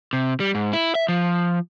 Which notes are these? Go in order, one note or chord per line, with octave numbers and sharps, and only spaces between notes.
C3
G3
G#2
E4
E5
F3